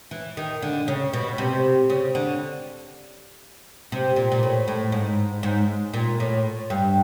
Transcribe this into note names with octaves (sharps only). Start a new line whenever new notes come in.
E3
D#3
D3
C#3
B2
C3
C#3
D3
C3
A#2
A#2
A2
A2
G#2
G#2
A#2
A2
G2